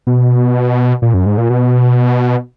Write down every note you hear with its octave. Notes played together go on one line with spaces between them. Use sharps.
B2
A#2
F#2
G#2
A#2
B2